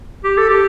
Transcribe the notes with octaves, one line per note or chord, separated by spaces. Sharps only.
G4
A4
G4